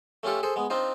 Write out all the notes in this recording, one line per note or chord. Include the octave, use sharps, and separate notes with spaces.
A3 C#4 F4 G4 A4
G#4 A4 C5
G#3 B3
C4 D4 D#4 F4 C5